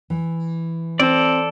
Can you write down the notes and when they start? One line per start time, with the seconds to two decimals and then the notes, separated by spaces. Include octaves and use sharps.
0.10 E3
0.99 C4 A4 D5